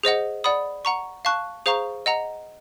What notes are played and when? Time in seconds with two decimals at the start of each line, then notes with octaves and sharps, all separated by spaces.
0.03 G#4 C5 D#5 F#5
0.44 D5 F#5 B5 D#6
0.85 F#5 A#5 C#6
1.25 F5 A5 C#6 F#6
1.66 G#4 C5 F5 A#5 C#6
2.06 D#5 F#5 A#5